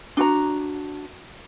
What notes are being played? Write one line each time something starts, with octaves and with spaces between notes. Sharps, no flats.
D4 F#4 A#5